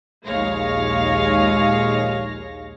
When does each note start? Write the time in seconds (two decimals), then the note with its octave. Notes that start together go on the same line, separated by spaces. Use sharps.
0.24 A#1 D#2 G#3 C#5 F5 A#6